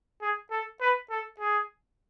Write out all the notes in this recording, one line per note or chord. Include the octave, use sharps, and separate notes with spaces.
G#4
A4
B4
A4
G#4